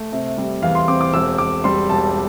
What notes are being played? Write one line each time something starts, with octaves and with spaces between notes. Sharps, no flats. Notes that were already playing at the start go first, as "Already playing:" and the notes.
Already playing: A3
C3
G3
E2 F5
C6
C4 D6
D6
E1 E6
E1 D6
G3 C6
E1 A5